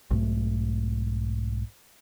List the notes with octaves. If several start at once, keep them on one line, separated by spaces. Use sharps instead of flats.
B1 G#2 A3